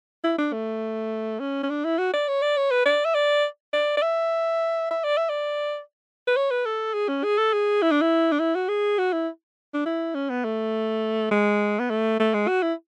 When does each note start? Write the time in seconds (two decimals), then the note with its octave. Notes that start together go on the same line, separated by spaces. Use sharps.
0.24 E4
0.38 D4
0.53 A3
1.40 C#4
1.63 C#4
1.70 D4
1.84 E4
1.98 F#4
2.13 D5
2.28 C#5
2.42 D5
2.57 C#5
2.71 B4
2.85 D5
3.05 E5
3.14 D5
3.73 D5
3.97 D5
4.02 E5
4.91 E5
5.04 D5
5.17 E5
5.29 D5
6.27 B4
6.36 C#5
6.51 B4
6.66 A4
6.94 G#4
7.08 C#4
7.24 G#4
7.38 A4
7.53 G#4
7.82 E4
7.91 D4
8.02 E4
8.32 D4
8.39 E4
8.55 F#4
8.69 G#4
8.99 F#4
9.13 E4
9.74 D4
9.85 E4
10.14 C#4
10.30 B3
10.44 A3
11.31 G#3
11.79 B3
11.90 A3
12.19 A3
12.34 G#3
12.48 F#4
12.62 E4